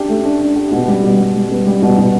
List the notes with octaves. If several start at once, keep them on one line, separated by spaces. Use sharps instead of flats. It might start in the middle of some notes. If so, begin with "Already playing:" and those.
Already playing: D4 G4
A3
D4
D4
G4
B2
G3
B2
G3
G3
B3
G3
B2
B2